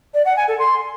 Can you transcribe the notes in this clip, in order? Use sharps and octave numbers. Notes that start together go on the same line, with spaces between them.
D5
F#5
G#5
A4
C6